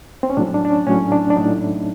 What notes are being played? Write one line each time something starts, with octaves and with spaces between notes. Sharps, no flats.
C4
C#4
A2 F#3 D4
D4
D4
C#4
A2 F#3 C#4
D4
D4
A2 F#3 D#4
E4